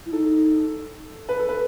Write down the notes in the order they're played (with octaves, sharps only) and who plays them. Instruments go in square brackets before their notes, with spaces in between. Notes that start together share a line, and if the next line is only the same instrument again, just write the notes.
[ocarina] E4
[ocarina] D#4 [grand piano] A4
[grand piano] B4
A4
B4